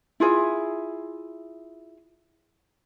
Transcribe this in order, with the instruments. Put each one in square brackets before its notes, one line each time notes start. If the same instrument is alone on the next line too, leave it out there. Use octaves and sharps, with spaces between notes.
[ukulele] E4 F4 G#4 E5